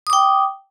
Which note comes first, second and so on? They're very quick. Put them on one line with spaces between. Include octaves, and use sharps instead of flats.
D#6 D6 G5